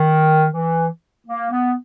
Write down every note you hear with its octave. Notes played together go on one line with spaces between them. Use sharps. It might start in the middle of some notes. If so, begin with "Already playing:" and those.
Already playing: D#3
E3
A#3
B3